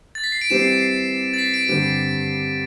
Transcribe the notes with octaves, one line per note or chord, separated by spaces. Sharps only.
A6
B6
C7
D7
E3 G3 C4 G4 E7
C7
D7
C7
A6
B6
D7
G2 D3 G3 C4 G4 D7